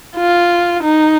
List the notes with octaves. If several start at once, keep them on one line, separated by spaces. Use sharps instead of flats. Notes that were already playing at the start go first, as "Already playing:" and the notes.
F4
D#4